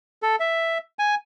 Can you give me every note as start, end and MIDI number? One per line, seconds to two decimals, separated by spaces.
0.23 0.36 69
0.40 0.78 76
0.99 1.15 80